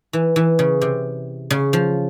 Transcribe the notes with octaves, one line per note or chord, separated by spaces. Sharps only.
E3
E3
C#3
C3
C#3
F3